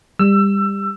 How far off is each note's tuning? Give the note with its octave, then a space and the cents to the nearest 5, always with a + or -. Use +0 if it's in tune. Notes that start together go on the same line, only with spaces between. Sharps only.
G3 +25 E6 +25